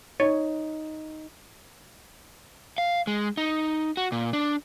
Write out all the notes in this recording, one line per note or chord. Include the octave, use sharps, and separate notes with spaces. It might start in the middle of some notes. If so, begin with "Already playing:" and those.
D#4 C#5
F5
G#3
D#4
F#4
A#2
D4